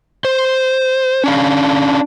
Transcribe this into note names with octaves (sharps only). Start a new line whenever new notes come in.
C5
C#4 D4 F5